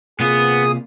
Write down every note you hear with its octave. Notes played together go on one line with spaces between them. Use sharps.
C3 A#3 B3 F4 G#4 D#6